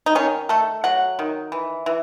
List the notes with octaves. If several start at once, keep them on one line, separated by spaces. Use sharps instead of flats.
D#4
D#3 C#4
A3 A4
F#3 F#5
D#3
E3
E3